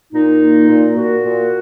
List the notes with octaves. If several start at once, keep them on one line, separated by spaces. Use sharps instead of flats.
A#2 D#4
A#3
A#2
A#2 F#4
A#2